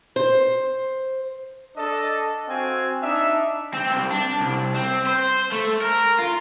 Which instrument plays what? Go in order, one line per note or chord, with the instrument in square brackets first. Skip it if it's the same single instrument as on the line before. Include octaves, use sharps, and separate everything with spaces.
[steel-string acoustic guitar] C5
[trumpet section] D4 A4 D#5
C4 F#4 F5 G#5
D4 D#4 E5
[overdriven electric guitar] C4
C2
D4
C2
C4
C5
A3
A#4
F4